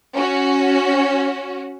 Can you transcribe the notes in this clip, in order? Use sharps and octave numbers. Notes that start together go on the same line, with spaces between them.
C#4 F#4